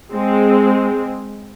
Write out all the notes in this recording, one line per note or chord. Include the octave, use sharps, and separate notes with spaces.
G#3 C4